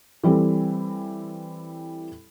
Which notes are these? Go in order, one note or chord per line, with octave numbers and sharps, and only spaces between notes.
E3 G3 C4 A4